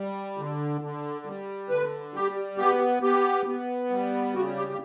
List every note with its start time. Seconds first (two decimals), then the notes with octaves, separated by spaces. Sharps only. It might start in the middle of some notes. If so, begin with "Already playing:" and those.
Already playing: G3
0.37 D3
0.81 D3
1.26 G3
1.69 D3 B4
2.14 G3 G4
2.58 B3 G4
3.02 B3 G4
3.46 B3
3.90 G3
4.35 C#3 F#4
4.56 G4
4.70 G4